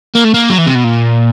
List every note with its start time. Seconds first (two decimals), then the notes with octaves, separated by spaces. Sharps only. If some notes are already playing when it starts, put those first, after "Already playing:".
0.15 A#3
0.25 A3
0.34 A#3
0.50 F#3
0.58 E3
0.66 C3
0.75 B2
0.84 A#2